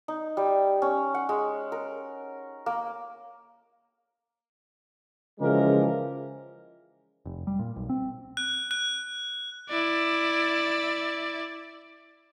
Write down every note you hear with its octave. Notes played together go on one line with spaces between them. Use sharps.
D#4
G3
C#4
F#5
G#3
A#4
A#3
C#3 E3 F3 G#3 G4 A#4
F1
G3
A#2
B1
C4
F#6
F#6
E4 D5